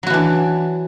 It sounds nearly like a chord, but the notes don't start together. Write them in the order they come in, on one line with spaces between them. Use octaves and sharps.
F#3 F#4 E3 D4